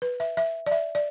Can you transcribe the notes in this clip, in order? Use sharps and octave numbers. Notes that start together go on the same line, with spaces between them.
B4
E5
E5
D5
E5
D5